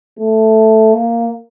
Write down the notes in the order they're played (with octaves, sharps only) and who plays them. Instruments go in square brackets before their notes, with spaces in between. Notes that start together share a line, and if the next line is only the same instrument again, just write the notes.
[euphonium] A3
A#3